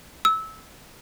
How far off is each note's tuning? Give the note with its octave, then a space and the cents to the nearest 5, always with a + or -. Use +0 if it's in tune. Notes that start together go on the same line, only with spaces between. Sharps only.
E6 -20